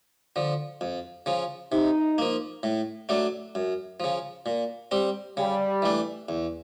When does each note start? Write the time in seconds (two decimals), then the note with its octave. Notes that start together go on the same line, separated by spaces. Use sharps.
0.36 D3 F3
0.81 F2
1.26 C#3 F3
1.72 C3 D#4
2.18 F3 A#3
2.63 A2
3.09 F#3 A3 D4
3.55 F#2
4.00 C#3 F3
4.46 A#2
4.91 G3 C4
5.37 C#3 G3
5.82 E3 A3 D4
6.29 E2